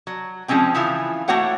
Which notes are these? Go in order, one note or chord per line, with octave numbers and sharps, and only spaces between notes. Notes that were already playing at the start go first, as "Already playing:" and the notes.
F#3
F3 G#3 C4 C#4 G5
C#3 E3 F3 E4 F4
A3 A#3 F#4 C#5 F#5 G5